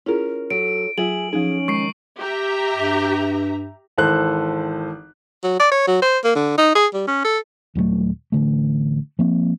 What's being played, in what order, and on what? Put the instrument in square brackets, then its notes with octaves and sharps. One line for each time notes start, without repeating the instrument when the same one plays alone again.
[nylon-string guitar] C#4 A#4 [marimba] E4 F4 G#4
[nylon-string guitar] F#3 [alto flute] A4 [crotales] D7
[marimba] F#3 F4 [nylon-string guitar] G#4 E5 [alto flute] G#5 [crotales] F#7
[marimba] F3 D#4 [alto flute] C#4 [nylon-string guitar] G#4
[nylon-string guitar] D#3 [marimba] G#3 [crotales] C#6 C7
[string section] G4 E5 A#5
[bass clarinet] G2
[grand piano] G#1 E3 A4 C5 F#6
[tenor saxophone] F#3
D5
C#5
F#3
C5
A#3
D3
D#4
G#4
G3
C#4
A4
[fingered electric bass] D#1 F#3 G3 A3
A1 D3 A3
F3 A#3 C4